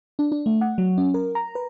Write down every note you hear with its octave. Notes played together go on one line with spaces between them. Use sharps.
D4
D4
A3
F#5
F#3
C#4
A#4
A#5
B4